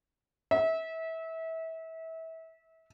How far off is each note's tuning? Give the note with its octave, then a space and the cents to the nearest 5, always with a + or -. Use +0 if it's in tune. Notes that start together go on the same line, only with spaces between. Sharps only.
E5 -25